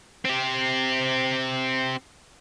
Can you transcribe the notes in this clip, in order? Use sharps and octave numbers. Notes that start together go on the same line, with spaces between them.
C4 G4